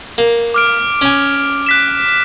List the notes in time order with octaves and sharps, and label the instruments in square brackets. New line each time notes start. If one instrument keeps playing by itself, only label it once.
[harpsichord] A#3
[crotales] D6 F6 D7
[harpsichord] C#4 G#5
[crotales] F#6 B6 E7